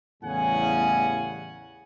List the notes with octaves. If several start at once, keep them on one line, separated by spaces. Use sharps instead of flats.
E2 A2 C#3 G3 F#5 G#5